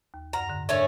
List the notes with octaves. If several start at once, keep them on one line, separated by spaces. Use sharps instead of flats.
D#2
F#2 F#5 A#5 F6
G#2 D3
G#2 A3 C#4 D4 A#4 C#5